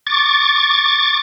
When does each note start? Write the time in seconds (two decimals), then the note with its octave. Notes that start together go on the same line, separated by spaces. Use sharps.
0.07 C#6 D6 A6